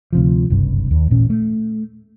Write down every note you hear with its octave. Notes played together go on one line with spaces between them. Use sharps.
D2 C3 F3
F#1 C2 G2
D#2
A1 A#2 C#4
A3